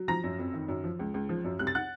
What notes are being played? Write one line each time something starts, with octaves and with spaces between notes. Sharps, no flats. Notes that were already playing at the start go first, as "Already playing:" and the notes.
Already playing: F#3
F3 A#5 A#6
F#2
F2
D#3
F#2
F3
C#2
C#2
F3
F#2
C2 F#6
A6
F#5 F#6